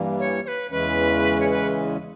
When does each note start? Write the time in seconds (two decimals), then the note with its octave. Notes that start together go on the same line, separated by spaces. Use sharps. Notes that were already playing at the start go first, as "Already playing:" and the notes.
Already playing: G2 E3 G3 A#3
0.19 C#5
0.45 C#5
0.48 B4
0.71 E2 C#3 E3 G#3 C#4 B4
1.40 C#5
1.50 B4